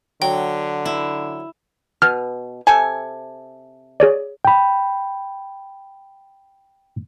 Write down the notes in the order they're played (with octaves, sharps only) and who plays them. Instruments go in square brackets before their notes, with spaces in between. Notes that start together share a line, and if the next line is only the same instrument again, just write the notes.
[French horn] D3 [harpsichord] F#3 [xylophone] G5
[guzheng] E4
[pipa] B2 [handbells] F6
[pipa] C3 A4 G#5
[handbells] G#4 C#5 D5
[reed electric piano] G5 B5